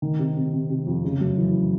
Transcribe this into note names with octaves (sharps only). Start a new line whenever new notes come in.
D#3
C3
C3
C3
C3
F2
C#3
F#2
E3